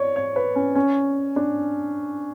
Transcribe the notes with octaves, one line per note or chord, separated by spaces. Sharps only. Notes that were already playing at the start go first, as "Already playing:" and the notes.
Already playing: C#5 D5
C#5
B4
C#4
C#4
D4